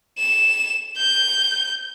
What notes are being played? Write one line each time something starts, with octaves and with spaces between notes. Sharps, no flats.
E7
G6